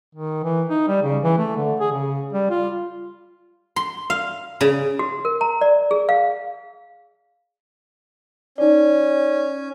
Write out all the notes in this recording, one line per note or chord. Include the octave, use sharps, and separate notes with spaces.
D#3
E3
D#4
G3
C#3
E3
A3
D3
G#4
C#3
G3
F4
C6
F5
C#3
F#4
A#4
A#5
D5
G#4
F5
C#4 D#4 D5